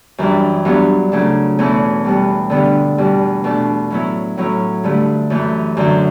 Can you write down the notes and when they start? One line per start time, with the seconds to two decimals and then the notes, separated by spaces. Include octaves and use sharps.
0.18 F#2 E3 G3 D4
0.65 G2 F#3 B3 D4
1.12 C#3 F#3 A3 D4
1.59 E2 B2 A3 C#4 E4
2.05 B2 G3 B3
2.50 G2 D3 G3 B3 D4
2.98 E2 B2 G3
3.44 B2 A3 D4
3.90 A2 F#3 B3 E4
4.37 A2 F#3 C#4 E4
4.84 G2 D3 A3 E4
5.30 F#2 E3 A3
5.77 F#2 D3 F#3